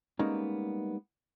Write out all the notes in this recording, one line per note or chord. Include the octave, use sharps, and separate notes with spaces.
G3 G#3 A#3 B3 C#4 D#4